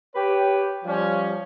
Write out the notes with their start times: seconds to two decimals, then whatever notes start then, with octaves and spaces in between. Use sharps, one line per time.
0.15 G4 B4 C#5
0.84 F3 G3 C#4